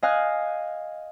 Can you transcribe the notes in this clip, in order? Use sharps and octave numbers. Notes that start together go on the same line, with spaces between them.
D#5 F5 G#5 F6 F#6